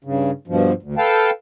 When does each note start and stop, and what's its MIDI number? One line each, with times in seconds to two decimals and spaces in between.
0.04 0.31 43
0.04 0.31 49
0.48 0.72 43
0.48 0.72 47
0.48 0.72 53
0.82 0.95 38
0.98 1.30 69
0.98 1.30 71
0.98 1.30 77
0.98 1.30 79
0.98 1.30 81